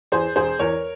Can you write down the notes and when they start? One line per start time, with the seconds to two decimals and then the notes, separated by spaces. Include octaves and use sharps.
0.12 E2 E3 G#4 C5
0.36 E1 G#4 C5
0.59 E2 E3 A#4 C#5